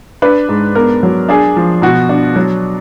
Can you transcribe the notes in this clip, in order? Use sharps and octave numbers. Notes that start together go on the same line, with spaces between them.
D4 B4
G#2
B3 A#4
F#3
D4 G#4
F3
B2 F#4
D4
F#3